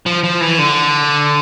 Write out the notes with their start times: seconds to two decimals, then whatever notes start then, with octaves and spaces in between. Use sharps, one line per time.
0.06 F3
0.24 F3
0.41 E3
0.58 D3